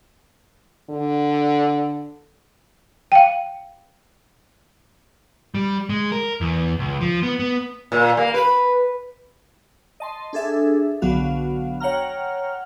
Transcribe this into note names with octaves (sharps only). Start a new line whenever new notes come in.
D3
F5 G5
G3
G#3
A#4
E2
C#2
F3
B3
B3
A#2
A#3
B4
D#5 A5 C6
D4 G#4 A4 E5
B1 D3 F#3 B3 F#4 F5
C#5 F#5 G5 A#5 F6